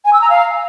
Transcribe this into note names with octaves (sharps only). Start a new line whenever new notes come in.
G#5
E6
A#5
F5